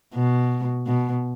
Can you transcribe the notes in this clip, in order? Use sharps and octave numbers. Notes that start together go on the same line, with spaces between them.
B2
B2